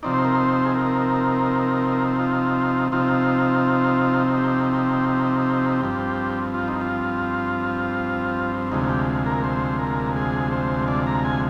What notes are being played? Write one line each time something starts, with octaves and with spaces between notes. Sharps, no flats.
C3 F3 C4 D#4 D5
C5
A#4
C5
G#4
A#4
F4
C3 F3 C4 D#4 F4
G4
G4
G4
G2 F3 C4
F4
D#4
F4
D2 C3 F3 G#3 D#4
G4
A#4
C5
A#4
G#4
C5
D5
A#5
G#5